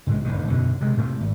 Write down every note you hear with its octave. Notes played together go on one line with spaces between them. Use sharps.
C#2 A2 F#3 G#3
F1 A#1 D3 D#3
B1 F#2 B2 D3
C3 G#3
A2 C3 A3
G#1